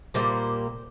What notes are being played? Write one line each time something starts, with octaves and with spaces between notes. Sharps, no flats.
A#2 G3 A#3 C5